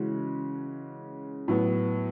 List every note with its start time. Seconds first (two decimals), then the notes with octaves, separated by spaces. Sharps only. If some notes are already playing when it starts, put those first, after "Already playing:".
Already playing: C#3 E3 G#3 C#4 F#4
1.48 A2 F#3 B3